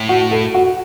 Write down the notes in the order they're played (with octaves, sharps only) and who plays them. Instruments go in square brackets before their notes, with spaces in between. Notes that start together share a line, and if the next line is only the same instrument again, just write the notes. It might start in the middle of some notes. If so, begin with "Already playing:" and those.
Already playing: [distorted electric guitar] A2
[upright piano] F#4
A4
F#4